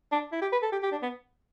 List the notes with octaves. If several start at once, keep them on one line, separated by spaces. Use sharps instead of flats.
D4
E4
G4
B4
A4
G4
G4
D4
B3